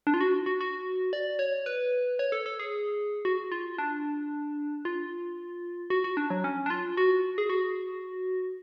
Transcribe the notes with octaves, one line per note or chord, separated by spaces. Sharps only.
D4
F4
F#4
F#4
F#4
D5
C#5
B4
C#5
A4
A4
G#4
F#4
F4
D4
F4
F#4
F#4
D4
F#3
C#4
D4
F4
F#4
G#4
F#4